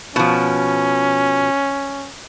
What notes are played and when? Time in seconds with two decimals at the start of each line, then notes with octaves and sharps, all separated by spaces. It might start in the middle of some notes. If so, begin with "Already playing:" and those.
0.16 B2 F3 C#4